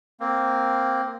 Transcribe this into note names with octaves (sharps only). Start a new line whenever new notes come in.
A#3 C4